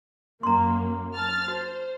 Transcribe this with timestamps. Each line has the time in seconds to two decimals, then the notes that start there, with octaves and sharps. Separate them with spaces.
0.43 F#2 A#3 A#5 C6
1.14 A5 F6 A6
1.48 F#4 C5